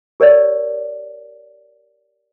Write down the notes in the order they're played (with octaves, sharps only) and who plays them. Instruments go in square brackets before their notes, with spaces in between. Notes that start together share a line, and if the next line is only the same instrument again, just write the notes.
[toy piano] G4 A#4 C#5 D5